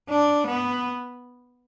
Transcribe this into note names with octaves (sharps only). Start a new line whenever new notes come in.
D4
B3